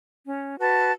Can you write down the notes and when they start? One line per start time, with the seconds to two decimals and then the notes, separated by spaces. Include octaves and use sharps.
0.25 C#4
0.58 F#4 B4 A5